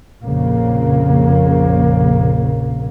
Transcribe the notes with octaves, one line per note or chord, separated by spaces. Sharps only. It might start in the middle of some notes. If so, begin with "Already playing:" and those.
A#1 F2 C#3 A#3